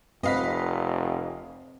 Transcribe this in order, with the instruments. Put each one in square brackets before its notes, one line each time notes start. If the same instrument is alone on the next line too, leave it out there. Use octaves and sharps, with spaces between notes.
[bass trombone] F1 [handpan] C4 B4 F#5 [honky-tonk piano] D#5 F5 B6